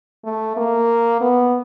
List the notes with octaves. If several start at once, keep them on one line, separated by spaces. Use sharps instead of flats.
A3
A#3
B3